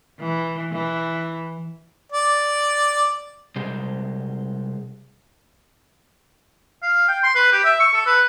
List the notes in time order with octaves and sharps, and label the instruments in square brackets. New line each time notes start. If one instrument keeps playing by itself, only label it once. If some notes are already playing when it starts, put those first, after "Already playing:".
[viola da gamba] E3
E3
[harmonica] D5
[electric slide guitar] C3 G3 G#3 C5
[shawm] F5
G5
C6
B4
G4
E5
C#6
A4
B4